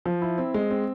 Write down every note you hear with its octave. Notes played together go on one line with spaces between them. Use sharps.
F3
E4
C4
G#3
C4